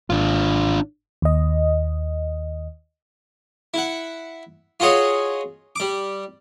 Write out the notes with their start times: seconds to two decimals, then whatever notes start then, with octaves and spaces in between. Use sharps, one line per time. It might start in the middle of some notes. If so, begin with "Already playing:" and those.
0.10 G#1 D4 F4
1.22 D#2 D#5
3.74 E4 F#5
4.80 F4 F#4 G#4 C#5 D#5
5.76 G3 D6